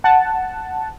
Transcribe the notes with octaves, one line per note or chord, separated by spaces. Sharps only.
F#5 A5